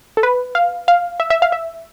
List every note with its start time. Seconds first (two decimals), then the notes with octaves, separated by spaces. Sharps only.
0.17 A4
0.23 B4
0.55 F5
0.88 F5
1.20 E5
1.30 E5
1.42 F5
1.52 E5